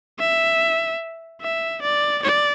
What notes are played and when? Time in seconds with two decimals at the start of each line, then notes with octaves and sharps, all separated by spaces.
0.19 E5
1.42 E5
1.82 D5
2.23 D5